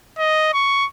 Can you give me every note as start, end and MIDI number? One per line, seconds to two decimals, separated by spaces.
0.18 0.49 75
0.54 0.86 85